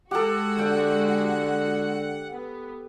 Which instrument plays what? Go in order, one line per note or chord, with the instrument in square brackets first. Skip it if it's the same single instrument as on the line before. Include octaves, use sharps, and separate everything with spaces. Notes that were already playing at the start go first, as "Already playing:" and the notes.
[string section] G#3 F#4 [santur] G4 A4 [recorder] F#5
[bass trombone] D3 [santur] G5
[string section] B3